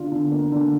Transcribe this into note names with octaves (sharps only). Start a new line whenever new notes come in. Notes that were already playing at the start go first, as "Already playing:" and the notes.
Already playing: D3 F4
D3
A#3
D3